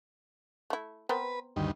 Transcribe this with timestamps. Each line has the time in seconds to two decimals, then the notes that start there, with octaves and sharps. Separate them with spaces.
0.70 A3 E4
1.09 B3 C4 A#4 B4
1.56 D2 G2 D#3